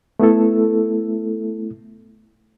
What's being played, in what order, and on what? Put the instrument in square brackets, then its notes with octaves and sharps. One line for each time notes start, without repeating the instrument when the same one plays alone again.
[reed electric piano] A3 B3 E4 A4